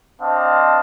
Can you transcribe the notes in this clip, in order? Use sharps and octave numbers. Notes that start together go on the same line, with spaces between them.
C4 D4 C5 D#5 F5 A5